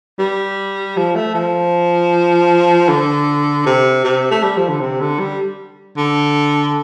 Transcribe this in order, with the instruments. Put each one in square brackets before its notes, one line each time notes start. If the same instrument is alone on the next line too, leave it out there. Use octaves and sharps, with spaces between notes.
[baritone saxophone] G3
F3
A3
F3
D3
C3
C3
A3
G3
F3
D3
C3
D3
G3
D3